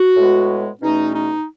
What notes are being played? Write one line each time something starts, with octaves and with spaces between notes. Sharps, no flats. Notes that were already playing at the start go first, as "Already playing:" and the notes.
Already playing: F#4
A2 G#3 B3
E2 B2 A3 C#4 D#4
D#4